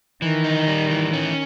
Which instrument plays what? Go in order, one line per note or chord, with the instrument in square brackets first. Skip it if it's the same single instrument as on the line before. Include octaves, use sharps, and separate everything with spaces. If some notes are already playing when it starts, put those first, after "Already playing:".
[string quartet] D#3 [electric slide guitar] E3
[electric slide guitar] D#4
G3
E3
C#4